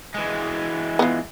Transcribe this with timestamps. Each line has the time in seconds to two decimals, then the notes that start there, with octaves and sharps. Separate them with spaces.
0.14 E3 G#3
0.99 B3 F4